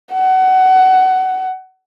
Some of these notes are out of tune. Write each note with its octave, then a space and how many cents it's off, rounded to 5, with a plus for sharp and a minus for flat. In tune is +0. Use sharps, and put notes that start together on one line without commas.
F#5 +20